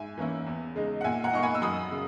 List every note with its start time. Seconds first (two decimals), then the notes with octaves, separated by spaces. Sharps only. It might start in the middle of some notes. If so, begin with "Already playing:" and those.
Already playing: G#2 E5 G#5
0.18 E3 A#3 C#4 E4
0.46 E2
0.75 C#3 G#3 D#4
1.01 F#5
1.04 A#2 E5 G#5
1.24 F#5 A#5
1.33 A#3 D#4 C#6
1.42 G#5 B5
1.55 E6
1.62 F#2 B5 D#6
1.91 C#3